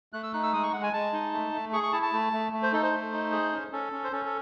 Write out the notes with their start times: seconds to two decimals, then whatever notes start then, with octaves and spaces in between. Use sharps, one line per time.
0.13 A3 F#6
0.23 E6
0.33 D#4 F#6
0.43 E6
0.53 G#3 D#6
0.63 C#6
0.73 G#3 F#5
0.83 G#5
0.93 G#3 A5
1.13 D#4
1.33 A3
1.53 A3
1.73 G#4 C#6
1.83 C#6
1.92 E4 A5
2.03 A5
2.13 A3
2.33 A3
2.53 A3
2.63 C5
2.72 D#4 A4
2.83 C5
2.93 A3
3.13 D#4
3.32 G#4
3.53 C#4
3.72 C#4 A4
3.93 C#4
4.04 C5
4.12 C#4 A4
4.25 A4